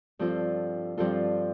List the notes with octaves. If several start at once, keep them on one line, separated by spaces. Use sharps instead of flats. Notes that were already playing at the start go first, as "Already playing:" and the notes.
G2 F3 C4 F4 A4
G2 F3 C4 F4 A4